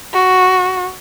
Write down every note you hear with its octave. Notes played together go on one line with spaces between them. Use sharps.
F#4